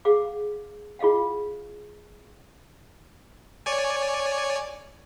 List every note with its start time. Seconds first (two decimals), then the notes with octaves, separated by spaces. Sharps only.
0.05 G#4 F5 F#5 D6
0.99 F4 G#4 D#5 F5 F#5
3.66 C#5 D5 G#5